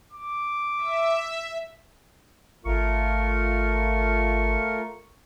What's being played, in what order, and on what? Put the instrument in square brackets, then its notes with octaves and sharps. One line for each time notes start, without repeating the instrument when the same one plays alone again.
[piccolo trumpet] D6
[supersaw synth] E5
[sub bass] G#1 [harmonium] A3 F4 A#4 [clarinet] C#6